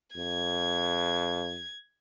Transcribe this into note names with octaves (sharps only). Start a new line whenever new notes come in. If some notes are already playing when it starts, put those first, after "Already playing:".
F2 G#6